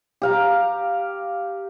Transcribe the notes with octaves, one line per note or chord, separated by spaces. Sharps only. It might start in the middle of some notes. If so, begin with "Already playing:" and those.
G4 F5 A#5